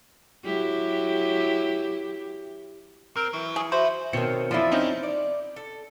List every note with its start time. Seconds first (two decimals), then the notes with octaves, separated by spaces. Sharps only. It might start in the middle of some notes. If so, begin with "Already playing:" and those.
0.45 F#3 E4 G4
3.16 C4 A#4
3.33 E3 F#3
3.56 G#4
3.72 F3 F#4 B4 C5 E5
4.13 B2 D#3 C4 C5 C#5 C#7
4.51 E2 F3 E4 F4 A4 D5 D#5
4.72 C4 C#4 D#4
5.03 D5
5.56 A4